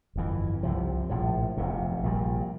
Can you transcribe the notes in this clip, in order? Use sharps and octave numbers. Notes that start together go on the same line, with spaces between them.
G1 F2 E3
C2 C3 F3
A#1 A2 F3
F1 E2 C3
A#1 A#2 G3